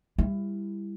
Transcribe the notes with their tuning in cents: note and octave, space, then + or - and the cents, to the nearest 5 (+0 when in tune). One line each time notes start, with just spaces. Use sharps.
G3 +25 E4 +15